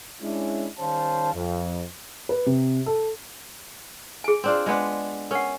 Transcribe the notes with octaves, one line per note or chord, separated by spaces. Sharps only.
G#3 C#4 D4 E4
D#3 G3 C#4 C5 F5 A5
F2
B4
C3
A4
G#4 G#5
C4 D4 F4
G#3 B3 D4
C#4 A#4 F#5